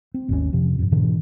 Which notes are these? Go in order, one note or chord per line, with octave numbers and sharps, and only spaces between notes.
C4
G#1 D#2 C3 C#4
F2 C3 F3
F2 G#2
G#2 B2 D3 E3